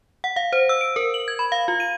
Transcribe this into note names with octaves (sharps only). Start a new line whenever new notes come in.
F#5
F5
C5
E6
D7
A#4
F#7
G#6
B5
F5
F4
D#7